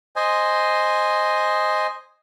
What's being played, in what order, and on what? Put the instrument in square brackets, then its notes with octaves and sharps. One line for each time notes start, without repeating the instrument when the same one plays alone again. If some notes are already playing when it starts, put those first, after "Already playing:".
[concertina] C5 D#5 G#5